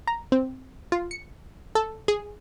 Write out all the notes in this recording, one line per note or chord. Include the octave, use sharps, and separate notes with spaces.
A#5
C4
F4
C#7
A4
G#4